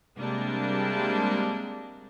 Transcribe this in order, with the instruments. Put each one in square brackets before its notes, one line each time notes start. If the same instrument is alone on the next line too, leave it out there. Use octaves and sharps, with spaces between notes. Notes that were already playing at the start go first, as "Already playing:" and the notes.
[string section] C3 G3 G#3 A#3 D4